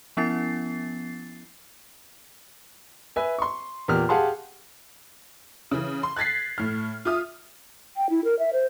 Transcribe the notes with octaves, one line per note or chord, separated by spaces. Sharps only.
F3 B3 C#4 E4 A6 C7
B4 E5 G#5
C6 C#6
E2 A#2 G4 F6
G4 G#4 F5 F#5 A5 C6
C#3 E3
C6
F#6 G#6 A6 B6 C7
A2 F6
F4 E5 D#6 F6
G5
E4
A#4
E5
C5